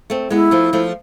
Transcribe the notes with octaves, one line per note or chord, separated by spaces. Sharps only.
A3 C4
G#3 B3 E4
F3 A3
F3 A3